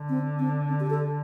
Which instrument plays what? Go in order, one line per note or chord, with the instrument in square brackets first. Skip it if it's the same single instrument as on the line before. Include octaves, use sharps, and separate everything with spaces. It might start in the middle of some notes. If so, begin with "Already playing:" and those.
Already playing: [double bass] D3
[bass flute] C4
C4
C4
G4
A4